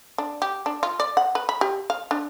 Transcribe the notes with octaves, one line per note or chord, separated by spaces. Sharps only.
D4
G4
D4
F4
D5
F#5
B4
B5
G4
F5
D4